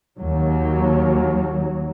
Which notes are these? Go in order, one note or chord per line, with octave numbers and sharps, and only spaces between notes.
D#2 F#3